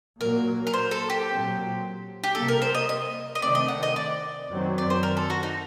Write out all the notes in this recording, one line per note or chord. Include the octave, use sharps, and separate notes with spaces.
A#2 F#3 A#3 A#4
A#4
C5
A4
G4
A#2 F#3 C4
G4
C3 G3 A#3 A4
A#4
C5
D#5
D#5
D#5
C3 D#3 A3 C4 D5
D#5
F#5
D#5
D5
F#2 D#3 F#3 C4
D5
C5
A#4
A4
F#4
D#4